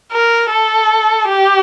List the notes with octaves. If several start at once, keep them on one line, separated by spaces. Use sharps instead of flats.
A#4
A4
G4